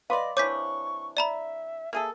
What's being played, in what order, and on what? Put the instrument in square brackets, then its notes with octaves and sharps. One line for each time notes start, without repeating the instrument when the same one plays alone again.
[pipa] B4 D5 [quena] D#5 [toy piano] F5 C6 D6
[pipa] C3 E3 D4 [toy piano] C#5 [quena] C#6 [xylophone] D6 G6 B6
[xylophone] D5 A#5 B5 [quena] E5
[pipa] A#3 G#4 A4 [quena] E5